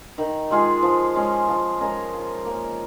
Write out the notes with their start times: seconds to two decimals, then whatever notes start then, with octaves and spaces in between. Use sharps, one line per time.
0.18 D#3
0.51 G#3 F4 G#4
0.83 F3
1.15 G#3 C#4
1.48 F3
1.81 G#3 C#4 A#4
2.13 F3
2.45 A#3 C#4